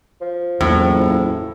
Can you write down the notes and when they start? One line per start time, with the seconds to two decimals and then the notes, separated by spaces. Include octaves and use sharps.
0.21 F3
0.61 F#1 E2 A2